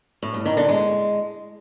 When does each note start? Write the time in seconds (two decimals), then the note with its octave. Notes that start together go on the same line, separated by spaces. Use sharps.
0.23 A2
0.34 G2
0.45 D#3
0.57 D3
0.68 G#3